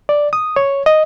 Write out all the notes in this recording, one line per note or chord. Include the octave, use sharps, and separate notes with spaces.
D5
D#6
C#5
D#5